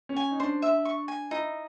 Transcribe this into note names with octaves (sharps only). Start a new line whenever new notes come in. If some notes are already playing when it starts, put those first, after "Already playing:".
C#4
G#5
D#4
D4 C5
E5
C#6
G#5
D#4 E4